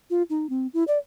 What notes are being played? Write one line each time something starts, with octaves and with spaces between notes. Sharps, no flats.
F4
D#4
C4
E4
D5